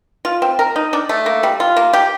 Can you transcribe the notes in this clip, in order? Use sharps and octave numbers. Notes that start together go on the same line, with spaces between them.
F4
C4
A#4
D#4
D4
A3
A#3
G3
F4
A#3
G4